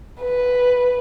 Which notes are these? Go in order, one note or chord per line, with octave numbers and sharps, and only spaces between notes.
B4